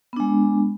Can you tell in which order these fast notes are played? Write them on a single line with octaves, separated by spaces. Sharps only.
B3 D4 G#3